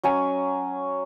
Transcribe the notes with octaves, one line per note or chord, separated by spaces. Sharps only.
F#3 C#4 G#5